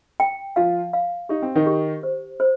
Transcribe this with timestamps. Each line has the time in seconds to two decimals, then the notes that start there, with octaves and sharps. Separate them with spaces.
0.20 G5
0.56 F3 F4 F5
0.93 F5
1.29 D#4 G4
1.42 C4
1.55 D#3 D#4
1.66 G4
2.03 C5
2.40 C5